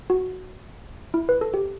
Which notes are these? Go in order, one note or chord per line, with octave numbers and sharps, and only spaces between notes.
F#4
E4
B4
A4
G4